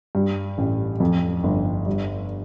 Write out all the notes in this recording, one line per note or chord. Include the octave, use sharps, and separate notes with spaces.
G2
A1
F2
G1
G2